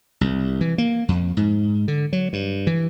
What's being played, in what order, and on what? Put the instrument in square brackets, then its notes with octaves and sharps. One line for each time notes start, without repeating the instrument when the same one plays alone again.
[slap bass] C2
E3
A#3
F2
G#2
D3
F#3
G2
E3